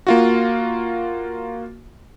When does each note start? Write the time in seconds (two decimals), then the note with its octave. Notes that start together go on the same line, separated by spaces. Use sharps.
0.07 A#3 F4 F#4